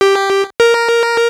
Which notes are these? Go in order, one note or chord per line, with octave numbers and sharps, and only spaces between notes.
G4
A#4